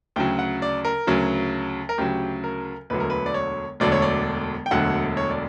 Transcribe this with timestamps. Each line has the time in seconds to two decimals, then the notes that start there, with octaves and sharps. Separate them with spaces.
0.16 D2 C#3 F#3 G5
0.39 F#5
0.62 D5
0.85 A#4
1.07 D2 C#3 F#3
1.89 A#4
1.98 D2 C#3 F#3 G4
2.44 A#4
2.90 E1 D2 D3 F#3 B4
3.00 A#4
3.10 B4
3.26 D5
3.34 C#5
3.80 E1 D2 D3 F#3 D5
3.92 C#5
4.02 D5
4.66 G5
4.71 E1 D2 D3 F#3 F#5
5.17 C#5
5.30 D5